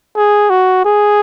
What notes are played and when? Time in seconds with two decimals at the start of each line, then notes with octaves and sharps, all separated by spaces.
0.16 G#4
0.50 F#4
0.85 G#4